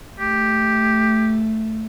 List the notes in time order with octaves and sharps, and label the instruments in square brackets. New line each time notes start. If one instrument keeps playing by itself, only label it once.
[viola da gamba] A3 [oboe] G4